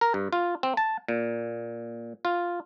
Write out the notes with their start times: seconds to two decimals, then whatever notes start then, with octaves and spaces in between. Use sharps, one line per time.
0.01 A#4
0.14 G2
0.33 F4
0.63 C4
0.77 A5
1.08 A#2
2.25 F4